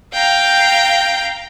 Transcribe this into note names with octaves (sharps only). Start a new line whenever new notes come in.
F5 G5 A#5